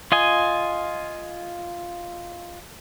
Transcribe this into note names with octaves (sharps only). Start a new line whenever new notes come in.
F4 D#5 G#5